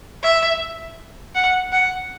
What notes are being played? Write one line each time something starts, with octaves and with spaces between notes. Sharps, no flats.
E5
F#5
F#5